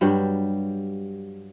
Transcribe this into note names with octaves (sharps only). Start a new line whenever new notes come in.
G2 F#3 G3 G4